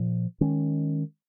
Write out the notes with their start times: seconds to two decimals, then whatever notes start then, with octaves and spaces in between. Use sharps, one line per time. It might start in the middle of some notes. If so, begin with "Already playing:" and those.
Already playing: A#2 F3
0.41 D#3 G#3 C#4